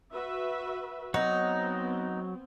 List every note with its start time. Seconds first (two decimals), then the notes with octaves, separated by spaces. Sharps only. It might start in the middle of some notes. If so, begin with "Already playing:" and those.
0.11 F#4 B4 E5
1.14 F#3 B3 C4 D#4 C#5 F#5